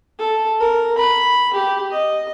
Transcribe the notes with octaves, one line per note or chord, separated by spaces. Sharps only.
A4
A#4
B5
G4
D#5